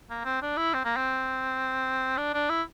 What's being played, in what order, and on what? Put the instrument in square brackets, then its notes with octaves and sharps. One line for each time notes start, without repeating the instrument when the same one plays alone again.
[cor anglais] A#3
C4
D4
E4
C4
A#3
C4
D4
D4
E4